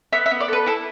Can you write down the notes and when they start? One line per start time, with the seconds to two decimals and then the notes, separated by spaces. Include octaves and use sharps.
0.13 B3 E5
0.26 E5
0.31 B3
0.40 D5
0.48 A4 B4
0.66 E4 A4